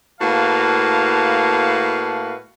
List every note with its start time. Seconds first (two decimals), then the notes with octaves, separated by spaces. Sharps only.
0.21 A2 A#3 F#4 B4 F5 A5